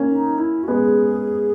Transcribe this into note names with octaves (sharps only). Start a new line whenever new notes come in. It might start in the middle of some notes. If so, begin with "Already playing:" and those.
Already playing: A#3 C#4
D#4
E4
F#4
G#3 B3 G#4